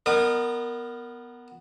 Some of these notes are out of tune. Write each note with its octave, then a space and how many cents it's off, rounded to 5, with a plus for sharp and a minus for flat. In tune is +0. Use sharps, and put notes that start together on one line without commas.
B3 +0 A#4 +0 D#5 -45